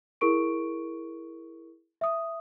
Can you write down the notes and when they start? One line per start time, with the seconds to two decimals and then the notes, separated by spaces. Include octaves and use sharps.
0.21 E4 G#4 A#4 C#6 D7
2.01 E5 D#6